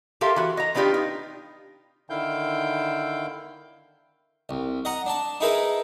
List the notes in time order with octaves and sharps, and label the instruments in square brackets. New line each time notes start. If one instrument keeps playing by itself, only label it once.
[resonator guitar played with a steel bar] F4 G4 A4 A#4 E5 F5
E3 F#4
D#5 A#5
D#3 B3 D4 F4 G4
D#4
[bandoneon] D3 D#3 E4 F5 G5 G6
[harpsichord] C2
D#5 F#5 A#5
D4 A5
D#4 E4 G#4 A#4 B4